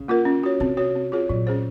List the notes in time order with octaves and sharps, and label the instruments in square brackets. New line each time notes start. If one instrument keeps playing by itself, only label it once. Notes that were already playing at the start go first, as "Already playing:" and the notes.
Already playing: [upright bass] C#3
[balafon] A#3 F4 A#4
C#4
F#4 C#5
[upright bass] C3 [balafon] C4
[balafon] F#4 C#5
C4
F4 G#4 C#5
[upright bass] A#2 [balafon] F#3
[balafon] C#4 G#4 C5